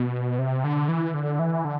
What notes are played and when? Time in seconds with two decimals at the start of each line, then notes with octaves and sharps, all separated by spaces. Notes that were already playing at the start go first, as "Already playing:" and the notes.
Already playing: B2
0.39 C3
0.64 D3
0.89 E3
1.14 D3
1.39 E3
1.65 D3